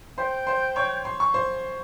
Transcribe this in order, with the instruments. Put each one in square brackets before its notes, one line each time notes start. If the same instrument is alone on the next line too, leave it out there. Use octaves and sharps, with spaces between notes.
[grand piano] C5 C6 [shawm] G5
[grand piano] C5 C6
C#5 C#6
C6
C#6
C5 C6